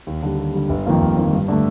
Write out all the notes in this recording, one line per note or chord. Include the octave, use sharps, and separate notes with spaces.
D#2
D3 G3
D#2
D3 G3
G1
F2 D#3 A#3 F4
G1
F2 D#3 A#3 F4
G2
D3 A3